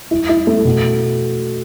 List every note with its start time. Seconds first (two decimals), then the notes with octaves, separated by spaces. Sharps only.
0.11 E4
0.29 E4
0.47 A3
0.65 B2